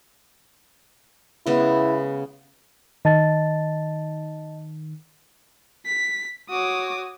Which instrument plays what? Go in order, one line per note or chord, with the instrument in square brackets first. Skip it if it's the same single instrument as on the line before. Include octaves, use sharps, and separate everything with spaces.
[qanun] C#3 G#3 B3 [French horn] E4
[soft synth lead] D#3 [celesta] D#5 A5 A6
[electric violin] B6
[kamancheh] F#4 C#5 [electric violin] D6 D#6